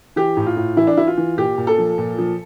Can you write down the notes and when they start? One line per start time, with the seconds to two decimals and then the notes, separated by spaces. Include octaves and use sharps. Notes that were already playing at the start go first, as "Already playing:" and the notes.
0.16 E3 G4
0.37 A2
0.46 F4
0.57 A2
0.77 E3 E4
0.87 D4
0.97 E3 E4
1.07 F4
1.17 E3
1.37 A#2 G4
1.58 A#2
1.67 A4
1.78 F3
1.98 A#2
2.18 F3